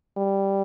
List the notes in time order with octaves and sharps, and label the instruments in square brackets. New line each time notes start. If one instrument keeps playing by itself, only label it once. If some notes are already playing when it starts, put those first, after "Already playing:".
[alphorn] G3